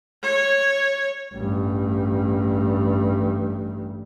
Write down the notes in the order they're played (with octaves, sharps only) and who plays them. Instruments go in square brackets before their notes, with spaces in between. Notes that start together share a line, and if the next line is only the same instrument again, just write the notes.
[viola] C#5
[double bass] A1 G2